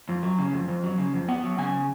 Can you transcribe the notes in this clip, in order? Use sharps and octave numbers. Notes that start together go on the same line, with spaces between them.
F2
F#3
C#3
F2
F2
F#3
C#3
F2
B3 F#5
F#3
C#3 G#5